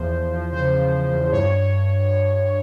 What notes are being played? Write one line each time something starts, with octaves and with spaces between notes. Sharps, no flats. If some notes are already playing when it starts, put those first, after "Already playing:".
Already playing: E2 F3 C5
E2
F3
C#3 C5
F3
F3
E2
G2 C#5